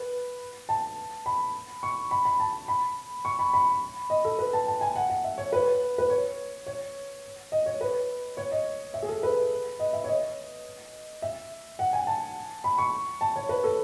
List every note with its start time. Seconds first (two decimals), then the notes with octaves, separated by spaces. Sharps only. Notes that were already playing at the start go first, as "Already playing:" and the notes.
Already playing: B4
0.69 A5
1.26 B5
1.83 C#6
2.11 B5
2.25 B5
2.40 A5
2.68 B5
3.25 C#6
3.39 B5
3.54 B5
4.10 D#5
4.25 A4
4.39 B4
4.53 A5
4.67 A5
4.81 G#5
4.96 F#5
5.10 F#5
5.24 E5
5.38 C#5
5.53 B4
5.98 B4
6.10 C#5
6.66 C#5
7.52 D#5
7.66 C#5
7.81 B4
8.37 C#5
8.52 D#5
8.94 E5
9.02 G#4
9.09 A4
9.23 B4
9.79 D#5
9.93 E5
10.04 C#5
10.08 D#5
11.22 E5
11.79 F#5
11.93 G#5
12.07 A5
12.64 B5
12.78 C#6
13.21 A5
13.36 C#5
13.49 B4
13.64 A4